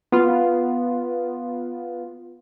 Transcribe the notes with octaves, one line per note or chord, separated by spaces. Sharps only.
B3 F4